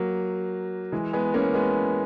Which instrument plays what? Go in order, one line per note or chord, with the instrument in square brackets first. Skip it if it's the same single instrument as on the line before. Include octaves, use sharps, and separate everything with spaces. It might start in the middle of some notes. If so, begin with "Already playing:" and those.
Already playing: [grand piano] F#3 A#3
E3 G#3
G#3 B3
A#3 C#4
G#3 B3